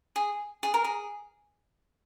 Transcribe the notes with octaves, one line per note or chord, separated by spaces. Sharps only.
G#4
G#4
A#4
G#4